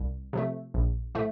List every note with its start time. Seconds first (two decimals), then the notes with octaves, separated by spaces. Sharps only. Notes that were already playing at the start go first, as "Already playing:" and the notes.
Already playing: C2
0.33 C3 F3 A3
0.74 A#1
1.15 A2 F3 A3